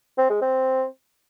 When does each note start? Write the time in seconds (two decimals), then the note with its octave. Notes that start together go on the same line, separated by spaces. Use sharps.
0.18 C4
0.30 G#3
0.42 C4